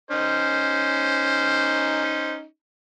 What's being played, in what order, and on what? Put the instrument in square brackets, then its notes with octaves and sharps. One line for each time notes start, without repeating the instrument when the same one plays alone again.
[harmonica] C#4 D#4 [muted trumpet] C5